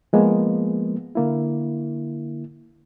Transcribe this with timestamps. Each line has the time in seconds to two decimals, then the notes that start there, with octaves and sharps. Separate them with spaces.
0.13 F3 G#3 A#3 B3
1.15 D3 A#3 E4